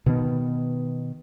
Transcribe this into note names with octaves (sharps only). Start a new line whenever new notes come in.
B2 D#3 B3